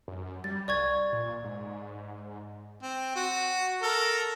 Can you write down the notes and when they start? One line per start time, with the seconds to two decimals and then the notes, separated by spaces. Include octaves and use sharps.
0.08 F#2
0.44 G3 A6
0.68 C2 D5 C#6 G#6
1.12 A#2
1.44 G#2
2.83 C4
3.16 F#4
3.82 A4 A#4